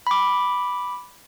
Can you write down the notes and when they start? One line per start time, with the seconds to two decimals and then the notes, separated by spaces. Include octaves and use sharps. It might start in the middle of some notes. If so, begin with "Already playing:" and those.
0.07 B5 D6